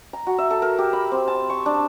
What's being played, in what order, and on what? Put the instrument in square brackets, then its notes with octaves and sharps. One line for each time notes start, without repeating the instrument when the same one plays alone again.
[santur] A#5
F#4
E5
A4
A#4
G4
B5
C4
A5
C#6
D4